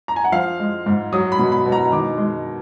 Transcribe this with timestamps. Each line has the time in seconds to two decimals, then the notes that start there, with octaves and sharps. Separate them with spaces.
0.08 A#5
0.16 G#5
0.24 F#5
0.32 F3 F5
0.60 G#3
0.86 G#2
1.12 F#3 D#6
1.32 B5
1.39 B2
1.52 B5
1.66 B2
1.72 A#5
1.92 D#3 D6
2.18 G#3